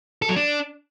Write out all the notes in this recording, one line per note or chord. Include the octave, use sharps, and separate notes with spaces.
A4
F#3
D4